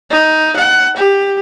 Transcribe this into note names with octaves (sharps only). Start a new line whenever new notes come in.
D#4
F#5
G4